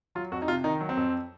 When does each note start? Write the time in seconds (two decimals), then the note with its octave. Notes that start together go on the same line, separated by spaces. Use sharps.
0.15 F#3 F4
0.32 F2 F#4
0.42 D#4
0.48 C3 F4
0.64 D#3 D#4
0.81 F#3
0.89 C4
0.97 F2